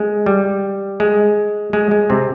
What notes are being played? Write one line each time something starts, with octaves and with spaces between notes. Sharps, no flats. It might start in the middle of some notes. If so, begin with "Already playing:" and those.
Already playing: G#3
G3
G#3
G#3
G#3
C3 C4